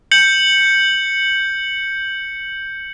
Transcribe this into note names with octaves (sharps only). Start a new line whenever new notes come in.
G6 C#7 F#7